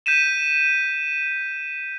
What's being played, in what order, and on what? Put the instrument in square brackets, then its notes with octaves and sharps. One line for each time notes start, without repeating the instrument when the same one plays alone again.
[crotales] G6 B6 D#7 E7